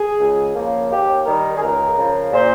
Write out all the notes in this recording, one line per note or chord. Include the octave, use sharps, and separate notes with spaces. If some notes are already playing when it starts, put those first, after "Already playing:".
Already playing: G#4
C#2
C#3 F3 A#3
D#2 G4
D#3 G3 A#4
G#4
C#2 A#4
C#3 F3
A#2 C5